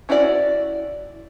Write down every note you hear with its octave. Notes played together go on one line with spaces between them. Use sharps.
C#4 E4 F#4 A#4 D5